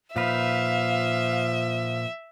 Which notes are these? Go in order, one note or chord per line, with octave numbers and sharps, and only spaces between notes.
A#2 F3 D#4 B4 E5 F5